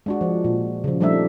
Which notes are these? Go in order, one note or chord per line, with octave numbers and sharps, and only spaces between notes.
G#3 D4 F#4
F3
A#2
C#3 F3
F3 G3 A3 D4 D#4 E5